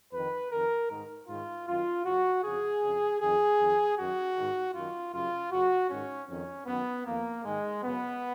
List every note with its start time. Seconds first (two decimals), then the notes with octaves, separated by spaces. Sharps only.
0.12 F2 D#3 B4
0.51 F2 D#3 A#4
0.90 G#2 D#3
1.28 G#2 D#3 F4
1.67 F#2 D#3 F4
2.05 F#2 C#3 F#4
2.44 F2 C#3 G#4
2.82 F2 C#3
3.21 F2 D#3 G#4
3.59 F2 D#3
3.98 F#2 D#3 F#4
4.36 G#2 D#3
4.74 F#2 D#3 F4
5.13 F#2 C#3 F4
5.52 F#2 C#3 F#4
5.90 G#2 D#3 C#4
6.28 F2 D#3 C#4
6.67 F#2 D#3 B3
7.06 F2 D#3 A#3
7.44 G#2 D#3 G#3
7.83 F#2 C#3 B3